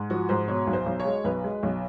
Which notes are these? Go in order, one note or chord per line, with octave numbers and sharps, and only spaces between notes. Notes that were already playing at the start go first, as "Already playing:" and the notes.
Already playing: G#2
F3 F#4
G#2 C5
B2 C#5
B1
C5
B1
C#5
G#3
B1 B4
G#3
B1